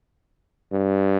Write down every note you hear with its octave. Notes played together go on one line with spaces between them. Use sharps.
G2